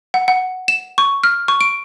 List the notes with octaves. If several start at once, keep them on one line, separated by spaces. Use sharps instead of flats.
F#5
F#5
E7
C#6
F6
C#6
D7